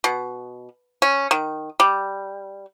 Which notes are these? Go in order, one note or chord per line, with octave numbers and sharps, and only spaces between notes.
B2
C#4
D#3
G3